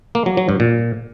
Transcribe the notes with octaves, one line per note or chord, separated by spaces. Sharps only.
A#3
F#3
F#3
G2
A#2